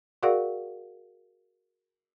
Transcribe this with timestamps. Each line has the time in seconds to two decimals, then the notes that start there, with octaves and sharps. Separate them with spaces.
0.23 F#4 G#4 A#4 D5 F5 F#5